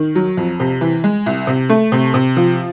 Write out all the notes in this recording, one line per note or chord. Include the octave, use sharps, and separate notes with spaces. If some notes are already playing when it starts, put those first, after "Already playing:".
Already playing: D#3
F#3
F2
C3
E3
G#3
C2
C3
A3
C3
C3
F3